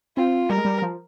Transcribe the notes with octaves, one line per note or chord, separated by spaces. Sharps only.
C4 F4
G3 A#4
G#3
G3
F3